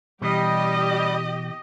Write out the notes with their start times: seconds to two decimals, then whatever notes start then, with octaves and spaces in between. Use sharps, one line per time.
0.22 B2 E3 G3 G4 D#5